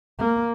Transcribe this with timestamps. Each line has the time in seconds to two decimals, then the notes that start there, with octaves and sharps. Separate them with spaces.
0.19 A#3